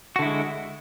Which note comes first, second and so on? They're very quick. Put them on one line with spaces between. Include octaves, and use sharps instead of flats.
F#4 D3 E4 G#3